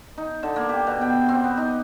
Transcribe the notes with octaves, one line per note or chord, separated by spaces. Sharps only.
D#4
D3
A#3
G4
B2
G5
C4
B3
D#4